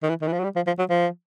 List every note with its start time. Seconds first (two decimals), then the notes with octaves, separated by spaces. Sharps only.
0.03 D#3
0.09 E3
0.21 D#3
0.27 E3
0.33 F3
0.39 F#3
0.44 G3
0.56 F3
0.67 F3
0.79 F#3
0.89 F3